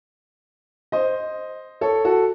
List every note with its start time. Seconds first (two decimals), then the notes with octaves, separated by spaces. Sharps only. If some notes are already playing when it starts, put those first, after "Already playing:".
0.92 C5 D#5
1.81 A4 C#5
2.05 F#4 A4